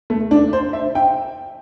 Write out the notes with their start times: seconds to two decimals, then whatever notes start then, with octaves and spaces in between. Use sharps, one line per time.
0.10 A3
0.31 D4
0.53 C5
0.73 E5
0.95 G5